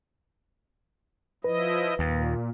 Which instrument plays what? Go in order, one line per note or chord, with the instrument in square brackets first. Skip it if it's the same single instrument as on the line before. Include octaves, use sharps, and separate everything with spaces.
[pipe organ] F3 E4 D#5 [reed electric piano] B4
[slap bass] D#2 [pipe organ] A#2